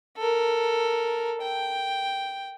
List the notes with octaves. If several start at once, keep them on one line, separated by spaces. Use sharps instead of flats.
A4 A#4
G5